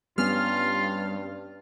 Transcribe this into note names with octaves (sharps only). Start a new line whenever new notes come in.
G2 G3 B3 C#4 F4 F6